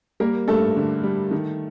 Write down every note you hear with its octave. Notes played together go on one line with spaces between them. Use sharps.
G3 A#3 A#4
G2 A3 A4
D3
G3
D#3